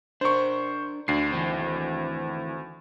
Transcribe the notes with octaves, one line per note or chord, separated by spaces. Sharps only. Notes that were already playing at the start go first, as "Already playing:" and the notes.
D4 A#4 C5 C#6
D2 D3 D4 C7
D#3 E3 C4